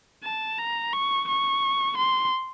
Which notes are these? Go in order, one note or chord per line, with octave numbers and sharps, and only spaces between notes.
A5
A#5
C#6
C#6
C6